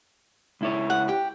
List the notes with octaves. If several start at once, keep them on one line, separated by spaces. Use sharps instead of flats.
C#2 E4 C#5
F#5
G4 G5